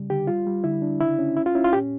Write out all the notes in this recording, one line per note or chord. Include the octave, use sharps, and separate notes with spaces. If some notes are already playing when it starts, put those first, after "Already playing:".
Already playing: C#3 G3
D3 G4
G3 F4
G3
D3 E4
D4
C#3 E4
C#4
C#4 E4
F4
C#4 E4
F4
A#2 G4